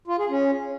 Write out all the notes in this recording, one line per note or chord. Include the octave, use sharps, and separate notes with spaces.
F4
G#4
C#4